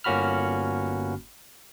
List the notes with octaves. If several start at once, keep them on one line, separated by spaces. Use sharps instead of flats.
G1 A#3 C#4 F#4 B5 F6